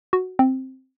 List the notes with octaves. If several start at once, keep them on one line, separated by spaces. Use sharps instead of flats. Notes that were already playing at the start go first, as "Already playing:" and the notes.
F#4
C4